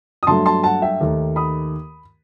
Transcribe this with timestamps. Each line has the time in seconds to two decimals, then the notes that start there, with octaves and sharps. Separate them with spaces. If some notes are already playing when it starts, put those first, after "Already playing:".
0.23 D#6
0.27 G2 F#3 A3 A5 C6
0.46 A5 C6
0.64 F#5 A5
0.82 E5 G5
1.01 D#2 D#3 A3
1.36 B5 D#6